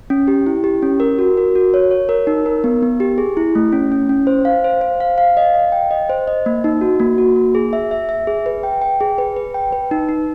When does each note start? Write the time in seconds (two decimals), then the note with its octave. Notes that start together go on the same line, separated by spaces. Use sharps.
0.10 C#4
0.28 G4
0.46 E4
0.64 G4
0.83 C#4
1.00 A#4
1.19 F#4
1.37 A#4
1.56 F#4
1.74 C#5
1.91 C#5
2.09 A#4
2.27 D#4
2.46 A#4
2.64 B3
2.83 B3
3.00 G4
3.18 G#4
3.37 E4
3.55 A3
3.72 C#4
3.92 C#4
4.09 C#4
4.27 C5
4.45 F5
4.64 C5
4.81 C5
5.00 F5
5.18 F5
5.37 D#5
5.54 D#5
5.72 G5
5.91 D#5
6.09 C5
6.27 D#5
6.46 A#3
6.64 D#4
6.81 F#4
7.00 A#3
7.18 F#4
7.36 A#3
7.55 G#4
7.73 E5
7.91 E5
8.09 E5
8.27 G#4
8.46 B4
8.63 G5
8.82 G5
9.00 G#4
9.18 B4
9.36 B4
9.54 G5
9.73 B4
9.91 D#4
10.09 D#4